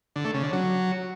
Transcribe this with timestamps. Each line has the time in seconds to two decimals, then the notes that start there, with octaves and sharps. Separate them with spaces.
0.16 D3
0.25 A3
0.34 C#3
0.43 D3
0.52 F#3